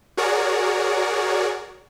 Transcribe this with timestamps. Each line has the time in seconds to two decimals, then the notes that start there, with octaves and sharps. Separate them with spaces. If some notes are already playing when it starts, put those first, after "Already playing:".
0.17 F#4 G#4 A#4 C#5 D5